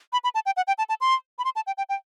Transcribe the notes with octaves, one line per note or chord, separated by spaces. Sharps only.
B5
B5
A5
G5
F#5
G5
A5
A5
C6
B5
C6
A5
G5
G5
G5